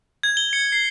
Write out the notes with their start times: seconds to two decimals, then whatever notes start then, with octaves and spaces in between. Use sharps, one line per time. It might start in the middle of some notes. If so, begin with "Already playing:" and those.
0.23 G#6
0.37 G7
0.53 C#7
0.72 C7